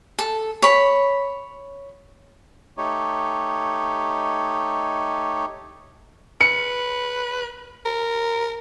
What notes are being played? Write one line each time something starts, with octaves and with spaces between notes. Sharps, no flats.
A4
C#5 B5
A3 D#4 G4 C#5
B4 C#7
A#4